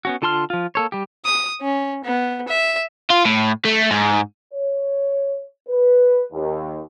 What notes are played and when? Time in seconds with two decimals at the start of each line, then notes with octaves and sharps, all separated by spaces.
0.05 B3 C#4 F#4
0.22 D3 F4 A5 C6 F6
0.50 F3 F4
0.75 A#3 A4 C#5
0.92 G3 G4
1.25 D#6
1.61 C#4
2.04 B3
2.48 E5
3.10 F4
3.25 A2
3.65 A3
3.91 G#2
4.54 C#5
5.68 B4
6.32 D#2